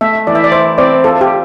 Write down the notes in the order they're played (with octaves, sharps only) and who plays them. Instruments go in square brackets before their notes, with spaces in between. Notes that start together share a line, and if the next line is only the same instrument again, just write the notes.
[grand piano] A3 [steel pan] E5
[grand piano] E3 [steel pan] D5
[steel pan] E5
D5
[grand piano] E4 [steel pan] C5
[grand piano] C4 [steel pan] D5
[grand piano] F4 [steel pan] A4
[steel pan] G4